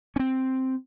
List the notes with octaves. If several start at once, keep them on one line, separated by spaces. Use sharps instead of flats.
C4 C#4